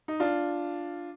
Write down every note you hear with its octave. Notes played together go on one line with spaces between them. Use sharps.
D#4
D4 F4